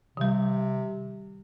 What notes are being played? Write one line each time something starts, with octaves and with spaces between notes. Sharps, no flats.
C3 D#3 G3